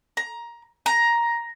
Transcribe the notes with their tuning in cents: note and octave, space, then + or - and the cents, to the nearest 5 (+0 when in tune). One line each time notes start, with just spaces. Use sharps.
A#5 +15
A#5 +10